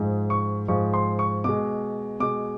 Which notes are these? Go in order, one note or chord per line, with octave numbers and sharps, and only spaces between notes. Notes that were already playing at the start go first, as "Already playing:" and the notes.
Already playing: G#2 F3 G#3
C#6
G#2 F3 G#3 C#6
C6
C#6
B2 G#3 D6
B2 G#3 D6